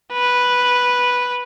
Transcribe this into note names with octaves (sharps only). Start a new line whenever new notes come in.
B4